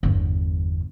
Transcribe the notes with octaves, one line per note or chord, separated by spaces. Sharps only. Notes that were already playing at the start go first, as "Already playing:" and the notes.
G1 E2